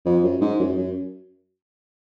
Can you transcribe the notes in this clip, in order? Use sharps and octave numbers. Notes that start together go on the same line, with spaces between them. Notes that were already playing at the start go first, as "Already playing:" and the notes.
F2
F#2
G#2
F#2
F#2